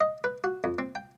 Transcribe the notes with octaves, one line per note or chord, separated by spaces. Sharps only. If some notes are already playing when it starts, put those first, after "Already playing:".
D#5
B4
F#4
F2
C4
G5